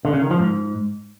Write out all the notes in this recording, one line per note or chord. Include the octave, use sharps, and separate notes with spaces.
D3
C#3
D#3
F3
G#2